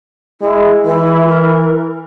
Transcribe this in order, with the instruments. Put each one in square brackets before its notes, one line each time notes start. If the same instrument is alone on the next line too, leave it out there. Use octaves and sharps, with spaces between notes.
[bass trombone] G#3 [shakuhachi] E4
[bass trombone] E3 [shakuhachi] E4
[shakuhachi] A#4